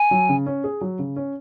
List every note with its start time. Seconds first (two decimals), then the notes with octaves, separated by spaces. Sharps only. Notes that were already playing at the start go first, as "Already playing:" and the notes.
Already playing: G#5
0.11 F#3
0.29 C#3
0.46 C#4
0.64 G#4
0.81 F#3
0.99 C#3
1.16 C#4